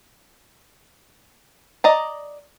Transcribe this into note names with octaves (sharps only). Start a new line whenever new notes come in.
D5 D#5 A#5